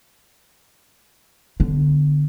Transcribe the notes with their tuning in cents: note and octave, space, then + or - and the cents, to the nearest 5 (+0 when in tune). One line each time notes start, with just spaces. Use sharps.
D3 +0 B3 +0